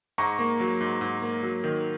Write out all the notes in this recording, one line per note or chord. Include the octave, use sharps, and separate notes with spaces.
G#2 A#5 C#6
A#3
F#3
G#2
G#2
A#3
F#3
D#3